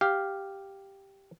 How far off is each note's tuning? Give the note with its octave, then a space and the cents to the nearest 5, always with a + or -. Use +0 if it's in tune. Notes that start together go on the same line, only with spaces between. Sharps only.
G4 +0 F5 +0